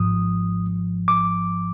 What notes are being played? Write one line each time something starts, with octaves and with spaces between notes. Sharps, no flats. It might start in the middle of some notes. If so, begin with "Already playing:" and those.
Already playing: G#1 G#2 F3 D#6
D6